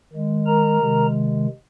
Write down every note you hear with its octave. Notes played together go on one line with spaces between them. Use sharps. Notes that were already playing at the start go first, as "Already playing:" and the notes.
D#3 G#3
A#4 A#5
C3 D#3 G#3